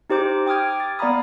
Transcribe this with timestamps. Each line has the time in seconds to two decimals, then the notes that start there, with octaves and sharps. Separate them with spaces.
0.10 D#4 G4 C5 D6 G6
0.46 G5 D6 D#6 F6 G#6
0.80 A6
0.99 B3 D5 F5 A#5 B5 D#6